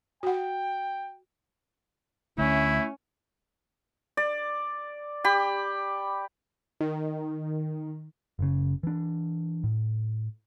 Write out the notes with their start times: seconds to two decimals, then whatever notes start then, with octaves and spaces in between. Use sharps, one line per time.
0.23 F#4 F#5 G5
2.38 D2 D3 A3 C#4 E4
4.17 D5
5.24 G4 B5
6.80 D#3
8.39 F#1 C#3
8.83 E3 D4
9.64 A2